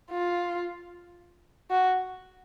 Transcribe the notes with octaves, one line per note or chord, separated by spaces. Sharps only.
F4
F#4